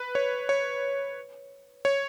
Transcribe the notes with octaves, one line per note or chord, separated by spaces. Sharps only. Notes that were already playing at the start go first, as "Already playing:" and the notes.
Already playing: B4
C#5
C#5
C#5